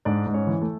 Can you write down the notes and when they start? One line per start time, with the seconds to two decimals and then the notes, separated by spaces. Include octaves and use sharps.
0.05 G#2 D4 D5
0.27 G#2
0.33 C#4 C#5
0.47 E3
0.62 A3 A4